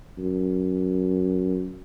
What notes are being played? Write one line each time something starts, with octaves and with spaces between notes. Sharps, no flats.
F#2